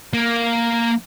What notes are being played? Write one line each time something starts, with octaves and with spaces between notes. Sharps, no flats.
A#3